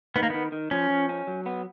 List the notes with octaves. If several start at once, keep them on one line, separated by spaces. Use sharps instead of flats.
D#3 B3
A#3
D#3 B3
D#3
F3 C#4
F3
C#4
F#3
B3